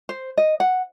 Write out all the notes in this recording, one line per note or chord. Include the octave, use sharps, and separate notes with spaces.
C5
D#5
F#5